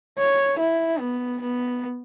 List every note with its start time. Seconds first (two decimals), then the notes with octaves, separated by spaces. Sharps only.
0.18 C#5
0.59 E4
0.99 B3
1.41 B3